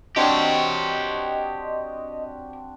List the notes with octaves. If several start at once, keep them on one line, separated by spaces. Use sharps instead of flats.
C4 D4 F#4 G4 C#5 D#5